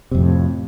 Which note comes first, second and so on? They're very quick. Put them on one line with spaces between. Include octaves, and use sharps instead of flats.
C3 F2 A2